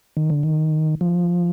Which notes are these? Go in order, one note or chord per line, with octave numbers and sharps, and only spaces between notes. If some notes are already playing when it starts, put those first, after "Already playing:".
D#3
D3
D#3
F3